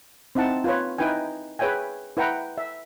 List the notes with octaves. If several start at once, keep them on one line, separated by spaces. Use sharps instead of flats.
C4 D#4 E4 F#5 A5
F4 B4 C#5
D#4 E4 B4 G5 G#5
G#4 B4 C#5 E5 G5 G#5
E4 B4 F#5 G5 A#5
E5